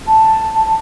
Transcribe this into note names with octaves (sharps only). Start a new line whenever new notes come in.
A5